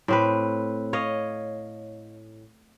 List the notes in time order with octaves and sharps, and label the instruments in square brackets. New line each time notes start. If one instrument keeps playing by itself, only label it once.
[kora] A2 C4 B4
C#5 D#5 F5